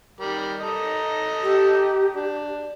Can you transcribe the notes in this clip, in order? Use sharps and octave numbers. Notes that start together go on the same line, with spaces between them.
D#3 G3 A#4
A4 D#5 A#5
G4
D4